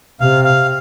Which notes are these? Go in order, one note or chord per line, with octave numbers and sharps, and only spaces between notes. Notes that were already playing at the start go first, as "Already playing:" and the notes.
C3 F5
F5